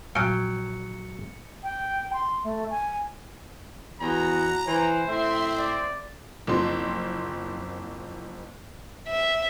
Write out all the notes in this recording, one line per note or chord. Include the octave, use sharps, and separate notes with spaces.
A#1 A#2 F#3 F5 G5 G#5 C#7
G5
C6
A3
G#5
E2 F#4 A#5
E3 C5
A2 C4 E5 C6
D5
F#1 F3 C4 C6
E5